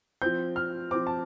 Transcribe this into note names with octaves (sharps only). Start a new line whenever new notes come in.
F3 C4 G6
F6
F3 C4 D6
A5